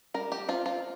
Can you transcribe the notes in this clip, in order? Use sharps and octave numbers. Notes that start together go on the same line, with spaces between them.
G3 A#4
G4
C4 F4
F4